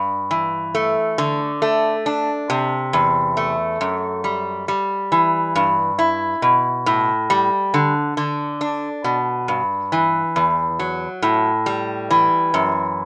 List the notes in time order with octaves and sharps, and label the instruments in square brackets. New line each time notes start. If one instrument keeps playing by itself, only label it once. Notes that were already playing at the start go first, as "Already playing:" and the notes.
Already playing: [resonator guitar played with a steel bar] G2
E3
A3
D3
A3
D4
C3
E2
A3
F#2
G3
G3
E3
G2
E4
B2
A2
G3
D3
D3
D4
B2
G2
E3
E2
F#3
A2
G3
E3
F#2